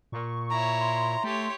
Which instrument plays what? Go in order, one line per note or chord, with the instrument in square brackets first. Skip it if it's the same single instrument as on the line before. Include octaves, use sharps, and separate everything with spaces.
[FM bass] A#2 [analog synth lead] C#6
[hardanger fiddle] E4 C#5 [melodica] A#5
[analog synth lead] C6
[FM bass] A3 [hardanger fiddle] G4 C#5